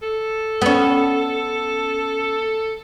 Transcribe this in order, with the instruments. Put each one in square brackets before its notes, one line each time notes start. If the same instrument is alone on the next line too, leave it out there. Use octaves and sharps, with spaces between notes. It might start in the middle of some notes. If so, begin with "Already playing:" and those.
[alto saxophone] A4
[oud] B3 C#4